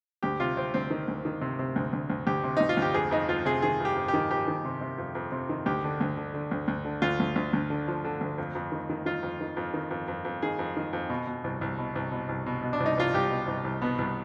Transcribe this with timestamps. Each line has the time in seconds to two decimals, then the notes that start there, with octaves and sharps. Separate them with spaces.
0.23 D2 G4
0.40 C3 F4
0.57 C3 C4
0.74 D2 C4
0.90 D#3
1.08 D2
1.25 D#3
1.42 C3
1.59 C3
1.76 D2
1.93 D2
2.10 D2
2.27 D2 G4
2.44 C3
2.57 D2 D#4
2.69 F4
2.77 D2 G4
2.94 F2 G#4
3.11 F2 D#4
3.28 F2 F4
3.45 C3 G#4
3.62 D#3 G#4
3.80 F2
3.85 G4
3.96 F2
4.08 G4
4.14 D#3
4.31 F2 G4
4.48 D#3
4.65 C3
4.81 C3
4.98 F2
5.15 F2
5.32 C3
5.49 D#3
5.66 D2 G4
5.84 D3
6.01 D2
6.17 D3
6.34 D3
6.51 D2
6.68 D2
6.85 D3
7.02 D2 F4
7.20 D2
7.36 D2
7.53 D2
7.70 D3
7.88 F3
8.04 D3
8.21 D2
8.38 F2
8.55 F2
8.72 D#3
8.90 D#3
9.06 D#3 F4
9.23 F2
9.41 D#3
9.57 F2
9.74 D#3
9.91 F2
10.08 F2
10.25 F2
10.42 D#3 G#4
10.59 F2
10.77 D#3
10.93 F2
11.10 B2
11.27 B2
11.44 C2
11.61 C2
11.78 B2
11.95 C2
12.12 B2
12.29 C2
12.46 B2
12.63 B2
12.73 D4
12.80 C2
12.86 D#4
12.98 C2 F4
13.13 C2 G4
13.30 B2
13.48 C2
13.64 C2
13.82 B2 B3
13.98 C2